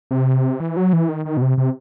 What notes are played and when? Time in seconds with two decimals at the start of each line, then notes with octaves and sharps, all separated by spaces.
0.11 C3
0.60 E3
0.77 F#3
0.93 E3
1.09 D#3
1.25 D#3
1.37 B2
1.42 C3
1.58 C3